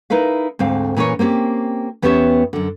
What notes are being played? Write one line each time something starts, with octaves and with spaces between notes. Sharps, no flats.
D#4 E4 A#4 B4 F5
D2 G#2 C4 F5
A#2 E3 C#4 A#4 C#5
A#3 C4 C#4 G4
E2 B3 C#4 G4 C#5 E5
F#2 D3